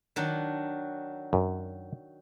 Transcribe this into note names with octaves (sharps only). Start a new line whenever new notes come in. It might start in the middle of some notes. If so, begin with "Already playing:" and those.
D#3 F#3 D4
F#2